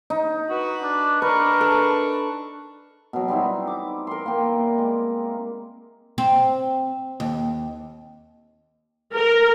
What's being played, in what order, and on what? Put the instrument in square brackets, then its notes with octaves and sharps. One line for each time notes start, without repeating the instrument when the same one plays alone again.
[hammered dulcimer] D#4
[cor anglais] F#4 [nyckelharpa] B4
[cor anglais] D4
[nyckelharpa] D4 C#6 [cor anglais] A#4 [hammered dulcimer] B4
[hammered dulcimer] A4
B2 F#3
G3 C4 D#4 E4
D6
A#4 C6
A#3 G5
G#3
[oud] C4
D#2
[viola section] A#4